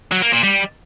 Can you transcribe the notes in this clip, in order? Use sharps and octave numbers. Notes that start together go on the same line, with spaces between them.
F#3
A#3
A#2
G3